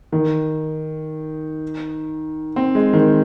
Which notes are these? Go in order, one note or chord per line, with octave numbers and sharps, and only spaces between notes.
D#3
C4
G#3
D#3